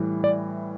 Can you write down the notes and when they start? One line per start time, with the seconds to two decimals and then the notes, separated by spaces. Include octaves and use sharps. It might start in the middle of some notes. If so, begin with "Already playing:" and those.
Already playing: A2 E3 G3
0.24 D5